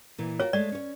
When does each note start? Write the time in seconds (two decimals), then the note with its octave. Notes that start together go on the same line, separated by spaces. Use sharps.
0.18 A#2 E3
0.40 F4 F#4 A#4 C#5
0.53 G#3 A3 D5
0.72 C#4 C#5